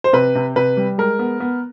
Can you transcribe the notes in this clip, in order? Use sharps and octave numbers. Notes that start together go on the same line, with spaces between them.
C5
C3 B4
C3
C3 B4
G3
G#3 A#4
B3
B3